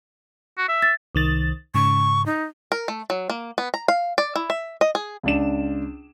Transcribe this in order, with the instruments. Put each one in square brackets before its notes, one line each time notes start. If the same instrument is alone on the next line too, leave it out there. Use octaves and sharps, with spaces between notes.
[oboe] F#4
E5
[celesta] A6
[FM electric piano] C2 D#3 A6
[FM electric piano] G#2 C#3 [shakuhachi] C#6
[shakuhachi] D#4
[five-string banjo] A#4
A3
F#3
A#3
B3
A#5
F5
D5
E4
E5
D#5
G#4
[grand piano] C#2 D4 E7